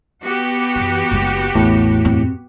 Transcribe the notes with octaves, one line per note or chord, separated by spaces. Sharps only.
B3 F#4 G4
F#2 E3
F#1 G#3
A1 E2 A2
F#2 C4